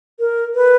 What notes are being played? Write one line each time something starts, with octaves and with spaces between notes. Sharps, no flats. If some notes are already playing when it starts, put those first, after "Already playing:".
A#4
B4